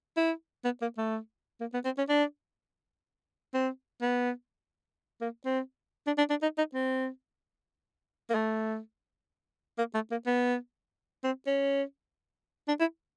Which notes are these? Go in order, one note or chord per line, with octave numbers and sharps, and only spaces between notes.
E4
B3
A#3
A3
A#3
B3
C4
C#4
D4
C4
B3
A#3
C4
D4
D4
D4
D#4
D#4
C4
A#3
A3
A#3
A3
A#3
B3
C4
C#4
D4
E4